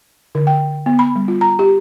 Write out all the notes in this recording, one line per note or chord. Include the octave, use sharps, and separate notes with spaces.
D3
G5
B3
B5
G3
F4
A#5
G4